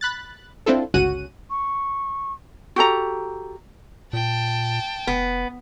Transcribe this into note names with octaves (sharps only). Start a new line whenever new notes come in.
B5 F#6 A6
C4 D4 E4 F4 A4
G1 C#2 C#4 F#4 F#5 D#7
C#6
F#4 G4 A4 A#5
A#2 G5 A5
F1 B3